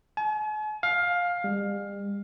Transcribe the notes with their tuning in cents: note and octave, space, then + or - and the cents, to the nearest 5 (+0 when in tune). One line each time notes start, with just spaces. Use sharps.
G#5 +45
F5 +15
G3 +45